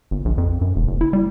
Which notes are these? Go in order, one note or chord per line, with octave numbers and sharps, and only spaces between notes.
G1
A#1
F2
F#2
E1
F#1
E4
G3